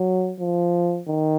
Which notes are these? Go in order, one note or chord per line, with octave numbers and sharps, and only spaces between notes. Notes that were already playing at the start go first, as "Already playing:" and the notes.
Already playing: F#3
F3
D#3